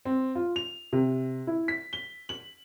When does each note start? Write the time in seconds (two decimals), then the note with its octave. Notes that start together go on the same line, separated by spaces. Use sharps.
0.05 C4
0.35 F4
0.56 F7
0.93 C3
1.47 E4
1.68 B6
1.93 G7
2.29 F#7